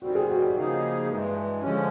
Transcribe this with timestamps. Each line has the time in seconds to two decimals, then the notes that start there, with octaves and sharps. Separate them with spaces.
0.02 F#2 D#3 G3 C4 F#4
0.15 G#4
0.29 F#4
0.41 G4
0.55 C#3 F3 A#3 D#4 G#4
1.09 G2 E3 G#3
1.63 D3 F3 G#3 C#4 G4